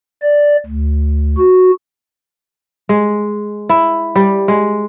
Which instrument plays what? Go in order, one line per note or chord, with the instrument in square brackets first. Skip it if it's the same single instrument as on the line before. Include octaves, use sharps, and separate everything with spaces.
[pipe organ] D5
D2
F#4
[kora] G#3
E4
G3
G#3